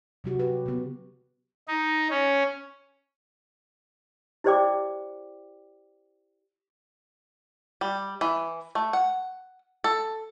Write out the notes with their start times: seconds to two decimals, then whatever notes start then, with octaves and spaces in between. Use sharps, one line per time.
0.24 C3 F#3 F#4 G4
0.39 G4 B4
0.66 C#3 B3
1.68 D#4
2.11 C#4
4.44 E4 G4 C5 D5 G5 D6
7.81 G3
8.21 E3
8.75 A3
8.93 F#5
9.84 A4